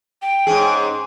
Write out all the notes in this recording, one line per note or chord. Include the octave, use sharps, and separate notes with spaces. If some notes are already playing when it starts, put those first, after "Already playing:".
G5
G#2 C#4 G#4